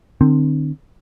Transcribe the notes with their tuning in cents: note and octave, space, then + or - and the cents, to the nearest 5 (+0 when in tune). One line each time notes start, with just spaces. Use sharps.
D3 +45 C4 +0